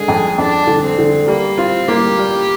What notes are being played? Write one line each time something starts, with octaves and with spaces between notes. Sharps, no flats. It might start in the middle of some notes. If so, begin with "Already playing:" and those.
Already playing: D3 G#3 G#4
F2
F2 D4
D3
C4
D3
G3 A#3
C4 F4
A#3 G4
G3